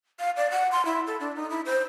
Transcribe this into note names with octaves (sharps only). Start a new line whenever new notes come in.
F5
D5
F#5
C6
E4
A4
D4
D#4
E4
C5